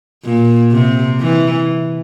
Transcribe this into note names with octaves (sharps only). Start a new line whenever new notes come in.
A#2
C3
E3